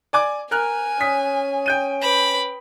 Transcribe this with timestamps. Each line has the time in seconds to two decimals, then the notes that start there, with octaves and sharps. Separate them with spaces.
0.13 D5 G#5 D6
0.51 A#4 G#5 F6 F#6
1.00 C#4 D#6 B6
1.66 G5 G6 D#7
2.01 B4 B5 D6